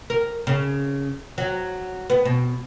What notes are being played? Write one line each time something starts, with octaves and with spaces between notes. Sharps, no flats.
A#4
C#3
F#3
B3
B2